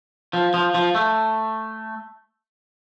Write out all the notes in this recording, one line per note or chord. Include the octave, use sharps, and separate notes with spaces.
F3
F3
F3
A3